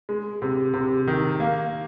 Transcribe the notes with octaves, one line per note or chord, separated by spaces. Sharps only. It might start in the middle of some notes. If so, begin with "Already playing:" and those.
G#3
C3
C3
D#3
A#3